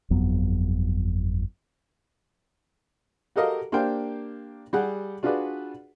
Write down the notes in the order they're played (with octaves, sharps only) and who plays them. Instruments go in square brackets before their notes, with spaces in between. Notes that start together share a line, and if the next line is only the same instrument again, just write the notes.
[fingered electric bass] G1 F2 F#3 B3
[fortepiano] F#4 G4 A4 A#4 D#5 F5
A#3 D4 G4 C5 F5 G5
G3 G4 G#4 F#5
D4 F4 F#4 G#4 B4 D5